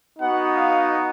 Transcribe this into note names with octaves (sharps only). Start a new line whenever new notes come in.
B3 D#4 F#4 F#5
F5